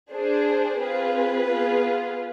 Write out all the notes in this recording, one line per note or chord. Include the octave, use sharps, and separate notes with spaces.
D4 G#4 C5
C4 F4 G#4 B4
B3 F4 G#4